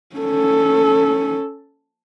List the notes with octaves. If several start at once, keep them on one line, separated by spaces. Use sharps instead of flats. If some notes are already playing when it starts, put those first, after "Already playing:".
C#4 A4